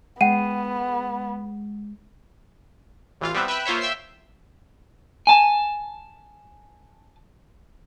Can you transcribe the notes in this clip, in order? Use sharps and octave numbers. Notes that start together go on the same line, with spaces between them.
G#3 B3 F#5 G5 D#7
A1 E3 F4 F5
G3 B3 C4 B4 E5
B4 E5 G5 E6 F#6
A#3 F4 C5 C#5 E5
E5 G5 E6 C7
G#5 A5